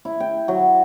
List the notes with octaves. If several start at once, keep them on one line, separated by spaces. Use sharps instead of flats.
E4
G5
F#3